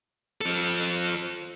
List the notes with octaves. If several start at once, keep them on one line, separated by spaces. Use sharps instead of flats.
F3 A4